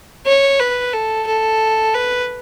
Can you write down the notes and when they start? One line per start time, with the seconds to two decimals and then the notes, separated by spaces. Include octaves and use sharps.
0.27 C#5
0.60 B4
0.93 A4
1.27 A4
1.94 B4